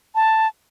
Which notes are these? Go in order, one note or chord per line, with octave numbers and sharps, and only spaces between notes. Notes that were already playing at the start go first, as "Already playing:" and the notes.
A5